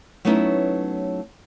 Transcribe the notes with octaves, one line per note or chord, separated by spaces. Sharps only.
F#3 A3 B3 C#4 D#4 E4